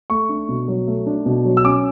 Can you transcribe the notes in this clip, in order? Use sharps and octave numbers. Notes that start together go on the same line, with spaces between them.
A3 C#6
D4
B2
F#3
A3
D4
B2
F#3
E6
C#4 D6